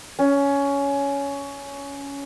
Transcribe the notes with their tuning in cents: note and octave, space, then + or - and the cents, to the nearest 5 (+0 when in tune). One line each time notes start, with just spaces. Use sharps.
C#4 +15